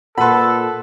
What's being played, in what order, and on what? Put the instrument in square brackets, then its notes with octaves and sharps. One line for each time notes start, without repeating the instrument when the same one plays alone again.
[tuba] A#2 [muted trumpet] A4 [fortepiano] B4 B5 [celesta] F#5 C6